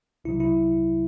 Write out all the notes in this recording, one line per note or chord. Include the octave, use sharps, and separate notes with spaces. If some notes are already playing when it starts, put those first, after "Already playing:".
C2 C3 F#3 E4
E4